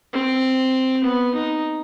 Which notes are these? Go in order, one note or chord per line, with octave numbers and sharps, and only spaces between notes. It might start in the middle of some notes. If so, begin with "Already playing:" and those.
C4
B3
D#4